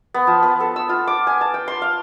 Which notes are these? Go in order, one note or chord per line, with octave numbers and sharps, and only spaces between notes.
B3
F3
B3
A4
E6
F4
D6
G#5
A5
G5
C6
F5